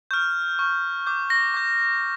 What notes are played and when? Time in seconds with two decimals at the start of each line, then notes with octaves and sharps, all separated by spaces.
0.11 C#6 F6 G6
0.59 C#6 F6
1.06 D6 G6
1.30 A#6
1.54 D6 G6